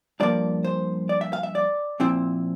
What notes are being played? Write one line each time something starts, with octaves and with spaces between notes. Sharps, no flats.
G2 F3 A#3 D5
C5
D5
E5
F5
E5
D5
A#2 F3 C4 E4